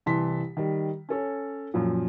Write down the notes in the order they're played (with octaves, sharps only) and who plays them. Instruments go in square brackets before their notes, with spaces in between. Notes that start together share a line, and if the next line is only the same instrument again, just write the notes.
[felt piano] C2 E3 A5 C6 B6
D#3 G3
C#4 A4 C#5
F#2 A#2 F3